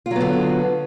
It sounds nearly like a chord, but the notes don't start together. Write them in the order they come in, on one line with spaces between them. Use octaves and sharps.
F4 F#3 B3 D3